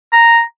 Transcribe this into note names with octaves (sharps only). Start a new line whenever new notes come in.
A#5